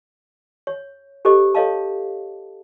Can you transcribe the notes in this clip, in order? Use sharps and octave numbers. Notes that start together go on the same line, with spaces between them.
C#5
G4 A4 C5 D#5 D6
A4 C#5 D#5 F5 A5